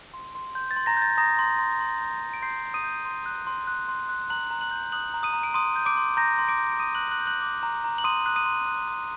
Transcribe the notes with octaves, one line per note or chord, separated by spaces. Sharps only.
C6
C6
C6 G6
A6
C6
A#5 A#6
G6
A6
A#5 D#6 A#6
C6
C6
C6
G6
C6
D7
C6 G6 C7
C6
D#6 D#7
G6
C6
F#6
C6
F#6
C6
F#6
A#5 F#6 F#7
A#5
F#6 F#7
G6
D#6 F#6 F#7
A#5
D#6 D#7
A#5
D7
C6 D#6 D#7
G6
D6 D7
C6
A#5 G6 A#6
C6
D6 D7
G6
D7
A#5 D#6 D#7
F#6 F#7
A#5
F#6 F#7
G6
F#6 F#7
D6
A#5
A#5
F#7
C6 D#6 D#7
F#6
D#6 D#7
C6
F#6
C6